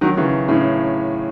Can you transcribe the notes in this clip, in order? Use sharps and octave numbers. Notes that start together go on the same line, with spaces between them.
D#3 F#3
C#3 E3
A2 C#3